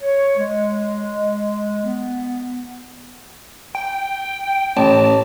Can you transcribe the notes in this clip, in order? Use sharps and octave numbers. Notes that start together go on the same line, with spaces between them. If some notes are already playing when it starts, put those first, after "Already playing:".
C#5
G#3
B3
G5
A1 A5